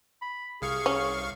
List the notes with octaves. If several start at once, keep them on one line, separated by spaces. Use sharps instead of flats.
B5
C2 G#4 F5 C#6
C#4